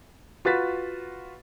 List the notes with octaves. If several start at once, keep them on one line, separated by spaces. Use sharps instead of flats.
F4 F#4 B4 A6 B6